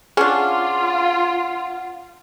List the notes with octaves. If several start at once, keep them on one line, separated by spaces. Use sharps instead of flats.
C#4 D4 F4 G#4 F#5